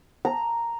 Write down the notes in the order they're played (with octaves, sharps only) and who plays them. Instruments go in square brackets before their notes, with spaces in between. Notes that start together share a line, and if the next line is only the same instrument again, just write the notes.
[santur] A#5